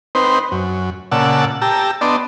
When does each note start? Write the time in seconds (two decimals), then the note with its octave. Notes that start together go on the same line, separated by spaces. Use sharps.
0.15 C4 D#4 B4 C5
0.52 F#2
1.12 A#2 C#3 D5 F#5 A5 E6
1.62 G4 A5 A#5 E6
2.01 B3 D4 D5 D#5 A5 C6